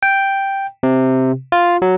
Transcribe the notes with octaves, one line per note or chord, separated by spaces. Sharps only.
G5
C3
F4
F#3